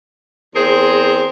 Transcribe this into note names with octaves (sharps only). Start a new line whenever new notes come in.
E2 C4 G#4 A#4 C5